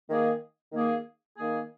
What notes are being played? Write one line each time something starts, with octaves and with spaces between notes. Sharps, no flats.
D#3 A#3 G#4
D#3 A#3 G#4
D#3 A#3 G#4